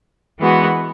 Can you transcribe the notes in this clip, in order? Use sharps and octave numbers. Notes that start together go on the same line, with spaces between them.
E3 G#3 B3 F#4